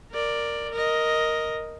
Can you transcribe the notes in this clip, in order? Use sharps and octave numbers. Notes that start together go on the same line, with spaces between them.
A#4 D5
A#4 D#5